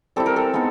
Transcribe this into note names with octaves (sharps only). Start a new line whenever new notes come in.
G3 C4 E4 A4
A#4
A4
G#3 B3 D#4